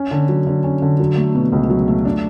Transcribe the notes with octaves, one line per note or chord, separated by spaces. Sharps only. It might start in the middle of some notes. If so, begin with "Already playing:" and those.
Already playing: C#4
D3
F#3
D3
C#4
D3
F#3
A3
B2
C#2
F#3
A3
D4